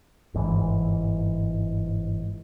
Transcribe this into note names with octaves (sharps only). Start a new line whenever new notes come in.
G1 G#2 C#3 E3